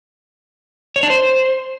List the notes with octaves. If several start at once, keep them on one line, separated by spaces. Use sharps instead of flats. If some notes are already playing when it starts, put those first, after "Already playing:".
C#5
D4
C5